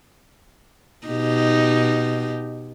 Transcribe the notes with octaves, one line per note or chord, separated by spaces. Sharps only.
B2 D#4 G4